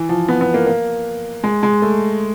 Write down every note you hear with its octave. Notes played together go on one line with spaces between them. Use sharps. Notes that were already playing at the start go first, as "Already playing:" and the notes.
Already playing: E3
F3
B3
B3
A#3
A#3
G#3
G#3
A3